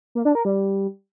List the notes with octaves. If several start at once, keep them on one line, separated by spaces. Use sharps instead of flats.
A#3
D4
A#4
G3